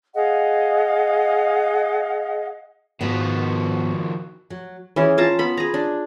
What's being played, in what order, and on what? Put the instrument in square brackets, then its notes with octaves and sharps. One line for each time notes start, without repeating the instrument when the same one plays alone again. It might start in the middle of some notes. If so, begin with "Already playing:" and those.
[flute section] G#4 D#5 F5 F#5
[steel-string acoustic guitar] G#2 B3 [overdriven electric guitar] D#3 F3 [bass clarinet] F#4
[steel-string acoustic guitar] F#3
[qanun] E3 C#4 G#4
F4 A5 A#5
B3 B5
G#4 A#5
D4